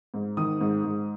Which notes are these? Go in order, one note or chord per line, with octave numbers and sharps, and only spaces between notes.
G#2
D#3 D#6
G#2
G#2